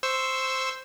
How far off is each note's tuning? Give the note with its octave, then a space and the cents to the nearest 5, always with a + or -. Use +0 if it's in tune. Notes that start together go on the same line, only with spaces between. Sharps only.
C5 +0 C#6 +0 E6 +0